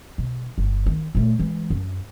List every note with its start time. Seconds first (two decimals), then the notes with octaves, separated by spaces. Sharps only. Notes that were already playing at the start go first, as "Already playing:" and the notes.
0.18 B2
0.58 G1
0.86 D#3
1.15 A#2 A3
1.39 E3 G#3
1.70 F#2